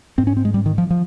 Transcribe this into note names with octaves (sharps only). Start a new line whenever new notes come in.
G#2 C4
C#4
C4
G#3
G3
D#3
F3
F3